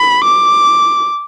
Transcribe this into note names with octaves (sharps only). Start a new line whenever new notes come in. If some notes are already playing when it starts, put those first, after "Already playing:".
Already playing: B5
D6